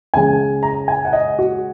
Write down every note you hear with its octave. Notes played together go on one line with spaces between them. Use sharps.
C#2 C#3 G#5
A#5
G#5
F#5
D#5
F#4